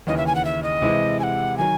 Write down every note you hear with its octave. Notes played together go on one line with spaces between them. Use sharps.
D#2 C#3 E3 D#5
E5
G#5
F#5
E5
D#5
C3 E3 G#3 C4 E4
G#5
F#5
D#3 F#3 G#5